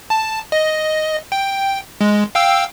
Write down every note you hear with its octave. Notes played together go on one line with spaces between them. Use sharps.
A5
D#5
G5
G#3
F5 G5 E6